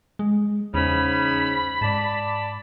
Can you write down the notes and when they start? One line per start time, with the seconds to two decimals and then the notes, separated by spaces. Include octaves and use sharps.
0.19 G#3
0.74 E2 G#2 C#3 B5
1.81 G#2 D5 A5